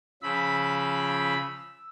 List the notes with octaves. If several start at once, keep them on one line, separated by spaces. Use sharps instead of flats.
C#3 F3 B5 E6